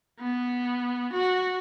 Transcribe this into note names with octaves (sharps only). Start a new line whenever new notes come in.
B3
F#4